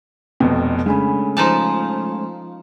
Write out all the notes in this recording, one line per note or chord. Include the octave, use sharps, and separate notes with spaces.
F1 F2 B2 G5
C#3 G#3 A3 C#4 D4 G#5 B5
F3 D#4 G#5 A5 C6